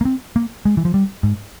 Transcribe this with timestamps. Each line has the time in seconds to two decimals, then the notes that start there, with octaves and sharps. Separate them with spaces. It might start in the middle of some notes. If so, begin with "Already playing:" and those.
0.01 A#3
0.05 C4
0.36 A#3
0.65 G#3
0.77 E3
0.85 F3
0.94 G3
1.23 G#2